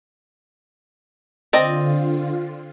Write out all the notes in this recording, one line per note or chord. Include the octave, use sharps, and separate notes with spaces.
D3 C4 F4 D5 D#5